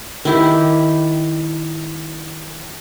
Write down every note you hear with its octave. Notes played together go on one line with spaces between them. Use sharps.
D#3 E4 G4